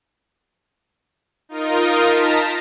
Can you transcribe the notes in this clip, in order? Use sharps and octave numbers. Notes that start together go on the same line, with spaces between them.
D#4 F4 A#4 D#5
A5 A#5 B6